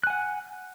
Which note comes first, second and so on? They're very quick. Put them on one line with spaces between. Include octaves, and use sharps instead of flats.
F#6 G#5 F#5